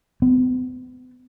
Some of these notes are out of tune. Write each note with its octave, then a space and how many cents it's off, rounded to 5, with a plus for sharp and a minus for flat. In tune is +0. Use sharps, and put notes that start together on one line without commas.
B3 +45